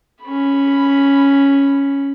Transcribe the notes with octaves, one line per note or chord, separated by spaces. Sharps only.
C#4 B5